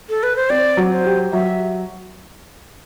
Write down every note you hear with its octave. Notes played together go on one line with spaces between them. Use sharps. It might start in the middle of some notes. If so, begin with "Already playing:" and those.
A4
B4
C5
C4 D5
F#3
C5
G4
F#3 E5